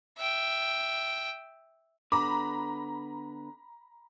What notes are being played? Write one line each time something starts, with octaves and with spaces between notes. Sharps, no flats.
E5 G5
D3 B3 A#5 B5 D6